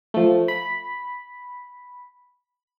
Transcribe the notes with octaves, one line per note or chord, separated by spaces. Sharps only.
F3 A3
B5